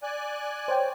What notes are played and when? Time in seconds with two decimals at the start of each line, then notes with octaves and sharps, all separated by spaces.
0.03 D5 G#5 F#6
0.68 C5 C#5 G5